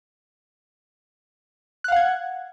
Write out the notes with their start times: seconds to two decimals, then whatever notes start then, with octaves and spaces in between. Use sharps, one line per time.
1.84 F#6
1.88 F5
1.92 F#5
1.96 G#6